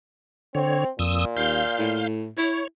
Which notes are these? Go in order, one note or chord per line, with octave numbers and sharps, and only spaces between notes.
D3 C4 C#5
F2 A#2 D#6 E6
D#2 F5 G6
A2
E4 C#5